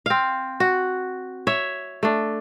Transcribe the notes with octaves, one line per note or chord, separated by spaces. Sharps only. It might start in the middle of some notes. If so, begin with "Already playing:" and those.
C4 F5
F#4
C#5 E5
A3 D4